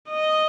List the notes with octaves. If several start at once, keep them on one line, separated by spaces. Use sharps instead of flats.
D#5